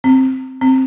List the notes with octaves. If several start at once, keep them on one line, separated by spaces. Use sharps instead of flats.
C4
C4